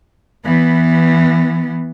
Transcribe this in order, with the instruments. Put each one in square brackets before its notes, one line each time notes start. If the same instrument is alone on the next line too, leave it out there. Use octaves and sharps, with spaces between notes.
[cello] E3 B3